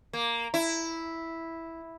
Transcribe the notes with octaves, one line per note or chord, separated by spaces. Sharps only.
A#3
E4